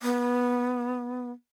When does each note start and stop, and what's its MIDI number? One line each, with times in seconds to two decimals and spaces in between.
0.03 1.31 59